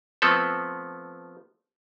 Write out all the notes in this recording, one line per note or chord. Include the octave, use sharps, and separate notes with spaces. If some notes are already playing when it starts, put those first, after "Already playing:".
F3 A3 B3 C4 A4